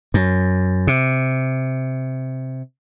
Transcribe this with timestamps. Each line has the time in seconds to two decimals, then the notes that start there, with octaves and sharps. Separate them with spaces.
0.14 F#2
0.87 C3